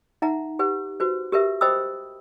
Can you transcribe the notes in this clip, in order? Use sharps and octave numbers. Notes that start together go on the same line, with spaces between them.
D#4 E5 F#5 A#5
G4 B4 F#5
F#4 B4 C5
G4 A#4 B4 E5
C5 D#5 G5 B5 D#6 E6